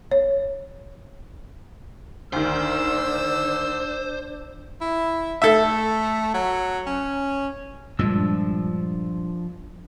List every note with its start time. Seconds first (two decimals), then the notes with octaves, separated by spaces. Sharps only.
0.11 C#5
2.33 D2 D#3 D4 C5 E6
4.81 E4
5.42 A3 A4 E5
6.34 F#3
6.87 C#4
7.99 G2 A#2 F3 G#3 D4 E6